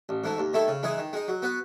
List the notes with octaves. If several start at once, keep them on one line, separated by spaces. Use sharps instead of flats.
A1
G#2 E3 A3
D#2
D#3 A3 E4 A4
C#3
E3 G#3 D#4 G#4
D#3
G#3 D#4
F#3
B3 F#4 B4